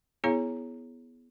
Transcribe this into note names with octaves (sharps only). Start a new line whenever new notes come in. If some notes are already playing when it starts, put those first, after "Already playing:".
B3 E4 G#4 C#5 F5 A#5